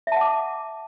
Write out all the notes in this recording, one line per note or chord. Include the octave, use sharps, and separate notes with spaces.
E5 F#5 A5 D6